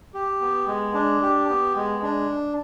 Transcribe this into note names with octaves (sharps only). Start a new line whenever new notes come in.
G4
B3
G#3
D4
G4
B3
G#3
D4